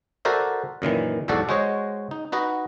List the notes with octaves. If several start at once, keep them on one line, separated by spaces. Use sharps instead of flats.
F#4 A4 A#4 C5 D5 E5
F#2 A#2 D#3 E3
B1 E2 G#2 F#4 A4 D5
G#3 F#4 C5 C#5 D#5
D#4
D#4 F#4 B4 D#5